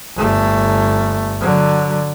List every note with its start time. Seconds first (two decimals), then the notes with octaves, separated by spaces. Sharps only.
0.16 G1 A3
1.40 D3 F#3